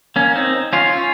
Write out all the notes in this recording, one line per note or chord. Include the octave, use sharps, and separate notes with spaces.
A#3 C#4
C4 D#4
C#4 F4
C#4 F4